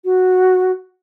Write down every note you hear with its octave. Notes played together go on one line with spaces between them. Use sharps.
F#4